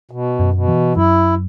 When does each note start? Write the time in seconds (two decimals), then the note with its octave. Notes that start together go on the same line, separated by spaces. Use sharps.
0.11 B2
0.39 F#2
0.54 B2
0.68 E3
0.96 F#2 E4